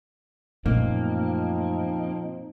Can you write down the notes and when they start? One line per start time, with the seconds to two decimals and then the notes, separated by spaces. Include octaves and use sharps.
0.66 F#2 A#2 F3 A3 A#3 C4 C#4 D#4